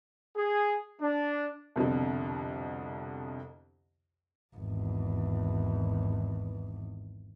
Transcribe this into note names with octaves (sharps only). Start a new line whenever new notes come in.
G#4
D4
C2 F2 B2 D3
G#1 E2